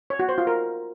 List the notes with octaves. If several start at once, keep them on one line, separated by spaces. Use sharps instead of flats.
C#5
F#4
C5
F4
A#4